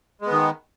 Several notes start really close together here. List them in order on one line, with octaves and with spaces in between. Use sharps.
G#3 B3 D#3